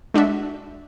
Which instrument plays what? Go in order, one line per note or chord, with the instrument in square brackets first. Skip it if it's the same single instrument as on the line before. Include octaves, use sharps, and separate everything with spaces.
[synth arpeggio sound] G#3 D4 F#4 E5